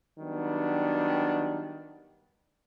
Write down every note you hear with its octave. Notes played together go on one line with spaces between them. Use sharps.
D#3 F#3 G3 B3 D4